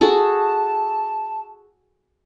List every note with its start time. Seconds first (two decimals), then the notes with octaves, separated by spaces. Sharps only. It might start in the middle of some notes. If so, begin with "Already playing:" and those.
0.01 F#4 G#4 A4 A5